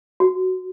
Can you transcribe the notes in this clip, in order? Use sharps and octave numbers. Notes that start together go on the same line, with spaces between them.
F#4